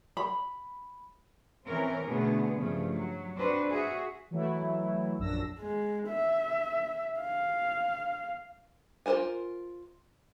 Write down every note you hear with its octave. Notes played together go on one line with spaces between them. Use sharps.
B5
E3 C4 C#4 A#4
B2 D3 A3 B3 G#4
G2 C#3 F3 A3
F#3
C4 D4 F#4 B4 C5
F#4 G#4 E5
E3 F#3 A3 E4
A#1 F#2 D4 E6 A#6
G#3
E5
F5
F4 G#4 A#4 C5 G#5